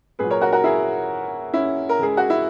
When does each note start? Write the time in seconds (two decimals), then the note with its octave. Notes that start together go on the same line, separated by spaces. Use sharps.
0.19 A#2 F#3 G#4 B4
0.30 A#4 C#5
0.41 F#4 A#4
0.52 F#4 A#4
0.64 E4 G#4
1.54 C#4 E4
1.89 A#4
1.99 C#3 G#3 G#4
2.17 F#4
2.30 E4